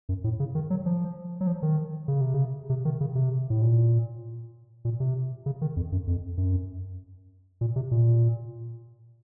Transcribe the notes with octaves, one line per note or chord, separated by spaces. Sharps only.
F#2
A2
C#3
D#3
F#3
F3
F#3
F3
D#3
C#3
C3
C#3
C3
D#3
C#3
C3
A2
A#2
A#2
C3
C#3
D#3
F2
F#2
F2
F#2
A#2
C3
A#2